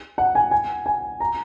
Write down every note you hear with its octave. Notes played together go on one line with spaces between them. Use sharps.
F#5
G#5
G#5
G#5
A#5